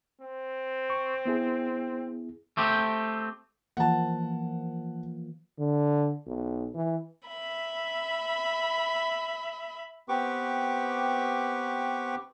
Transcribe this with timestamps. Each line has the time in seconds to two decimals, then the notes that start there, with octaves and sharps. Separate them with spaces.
0.21 C4
0.90 C#6
1.26 B3 E4 G#4
2.57 A3 C4 G4
3.77 E3 F3 A#3 F#5 A5
5.58 D3
6.27 B1
6.74 E3
7.27 E5 B5
10.09 B3 C4 G4 B4 C#6 D6